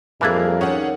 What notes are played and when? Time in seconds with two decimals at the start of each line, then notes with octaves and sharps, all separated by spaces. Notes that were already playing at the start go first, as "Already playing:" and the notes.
0.21 F2 E3 G3 A#3 D4 E4 G#4 A#4
0.61 D#3 C#4 G#4 C#5 F#5